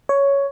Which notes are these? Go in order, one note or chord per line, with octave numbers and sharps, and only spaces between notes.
C#5